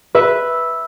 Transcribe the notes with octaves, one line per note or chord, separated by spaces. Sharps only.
B4 E5